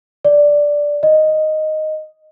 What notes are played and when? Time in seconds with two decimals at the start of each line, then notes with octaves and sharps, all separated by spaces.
0.25 D5
1.03 D#5